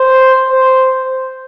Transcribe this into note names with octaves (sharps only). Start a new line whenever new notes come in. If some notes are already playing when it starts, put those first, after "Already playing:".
Already playing: C5
C5